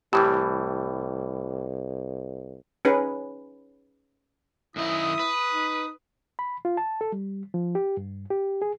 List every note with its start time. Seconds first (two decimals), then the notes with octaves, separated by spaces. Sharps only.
0.13 C2 A2 E3 G3 G4
2.85 C#4 D#4 G#4 B4
4.76 F#2 D#3 E4 D#5 D#6
5.19 B4
5.51 D#4
6.39 B5
6.65 F4
6.77 A5
7.01 A4
7.12 G3
7.54 F3
7.75 G4
7.97 G2
8.31 G4
8.62 G#4